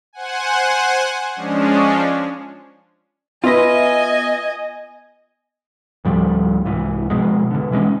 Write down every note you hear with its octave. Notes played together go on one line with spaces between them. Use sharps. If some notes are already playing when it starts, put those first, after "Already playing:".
C5 F#5 G#5
F3 G#3 C#4 D4
B3 F4 B4 D#5 E5 G#5 A#6
D2 A2 F3 G3
C2 G#2 E3
B2 F3 G#3
B2 D3
E3 G#3 C4 C#4